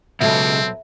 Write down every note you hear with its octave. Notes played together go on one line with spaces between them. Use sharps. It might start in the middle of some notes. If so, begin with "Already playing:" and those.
C#2 B2 F#3 C4 A4 E5